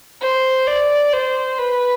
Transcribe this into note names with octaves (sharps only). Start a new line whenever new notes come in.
C5
D5
C5
B4